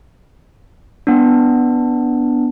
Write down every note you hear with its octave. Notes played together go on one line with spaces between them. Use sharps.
B3 D4